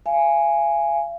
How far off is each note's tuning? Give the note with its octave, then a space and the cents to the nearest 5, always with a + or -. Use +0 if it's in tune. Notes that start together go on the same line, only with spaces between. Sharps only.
F5 -45 G#5 +0